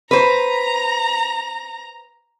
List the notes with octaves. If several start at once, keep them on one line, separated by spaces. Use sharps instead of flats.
B4 C5 A#5